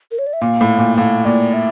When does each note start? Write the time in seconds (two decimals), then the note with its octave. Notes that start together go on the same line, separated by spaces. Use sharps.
0.11 A#4
0.19 C#5
0.27 D5
0.33 E5
0.41 A#2 F5
0.61 A2
0.78 A#2
0.97 A2 F5
1.25 A#2 D5
1.54 E5